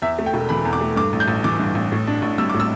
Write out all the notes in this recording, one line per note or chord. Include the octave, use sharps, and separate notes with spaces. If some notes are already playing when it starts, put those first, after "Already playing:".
E2 E5
A3
G5
E1
E3 B5
E2
D6
A3
G2 D6
A1
G6
A1
E3 D6
G2
A1
A2
D4
A1
G3 E6
A2 D6
E6